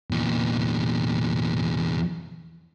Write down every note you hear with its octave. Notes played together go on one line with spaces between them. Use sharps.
E2 A#2